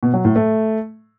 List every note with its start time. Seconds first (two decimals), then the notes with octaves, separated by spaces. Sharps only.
0.03 B2
0.14 F#3
0.25 A2
0.36 A3